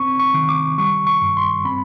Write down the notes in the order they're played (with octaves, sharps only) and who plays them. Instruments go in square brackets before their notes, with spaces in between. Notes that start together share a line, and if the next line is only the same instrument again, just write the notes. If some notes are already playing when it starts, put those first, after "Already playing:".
Already playing: [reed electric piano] C4 C#6
C#6
D#3
D6
G3 C#6
C#6
G2
C6
C4 B5